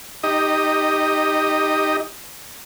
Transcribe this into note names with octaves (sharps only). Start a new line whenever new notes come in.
D#4 G4 D#5